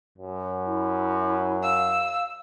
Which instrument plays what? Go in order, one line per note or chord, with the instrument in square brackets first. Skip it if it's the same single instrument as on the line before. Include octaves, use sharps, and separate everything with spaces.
[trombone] F#2
[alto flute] E4
[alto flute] F5 [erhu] E6